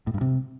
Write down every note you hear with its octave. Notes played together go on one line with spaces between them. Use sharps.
A2
G2
C3